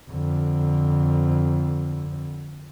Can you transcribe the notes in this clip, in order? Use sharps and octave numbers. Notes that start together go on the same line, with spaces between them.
F2 D3